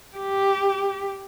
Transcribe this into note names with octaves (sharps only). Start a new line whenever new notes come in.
G4